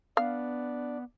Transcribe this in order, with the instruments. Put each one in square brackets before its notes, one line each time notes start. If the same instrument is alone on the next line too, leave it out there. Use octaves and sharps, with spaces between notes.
[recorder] B3 [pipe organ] D4 D5 [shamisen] F5